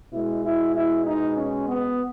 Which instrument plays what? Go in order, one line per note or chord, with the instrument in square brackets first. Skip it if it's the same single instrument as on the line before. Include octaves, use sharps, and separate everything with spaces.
[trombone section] B2 G#3 E4
E4
E4
D#4
C#4
B3